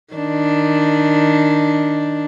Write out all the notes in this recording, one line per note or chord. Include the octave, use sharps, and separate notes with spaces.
D#3 D4